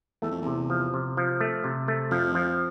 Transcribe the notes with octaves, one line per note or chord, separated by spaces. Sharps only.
E2 A3
F2
E2 C3
F3
C3
F3
A3
C3
A3
F2 F3
F3